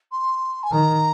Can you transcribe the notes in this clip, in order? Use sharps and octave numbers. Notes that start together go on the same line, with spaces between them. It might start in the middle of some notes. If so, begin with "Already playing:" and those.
C6
G#5
D#3 A#5